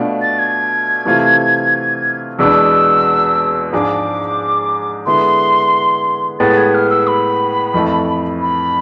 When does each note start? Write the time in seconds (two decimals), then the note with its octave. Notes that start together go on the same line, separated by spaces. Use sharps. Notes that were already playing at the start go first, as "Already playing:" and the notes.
Already playing: B2 A3 D4 F4
0.21 A6
0.38 G#6
1.05 C3 E3 A3 C4 F4
2.39 E2 B2 G#3 B3 D4 E6
3.72 G#2 F3 G#3 D4 G#4 D6
5.06 D3 G#3 B3 E4 C6
6.39 A2 G#3 B3 A6
6.57 G#6
6.74 F6
6.90 E6
7.07 B5
7.74 F2 E3 A3
8.41 B5